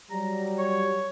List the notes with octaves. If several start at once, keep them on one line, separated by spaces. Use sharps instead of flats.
F#3 G3 A#5
C#5